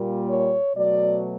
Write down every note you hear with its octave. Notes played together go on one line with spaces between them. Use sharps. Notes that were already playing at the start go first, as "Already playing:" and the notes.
Already playing: A#2 G3 A#3
C#5
B2 F#3 A3 D5